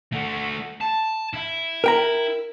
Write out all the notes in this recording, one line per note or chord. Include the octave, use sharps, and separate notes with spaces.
A3 F#4
A5
E4 E5
A#4 G5 A#5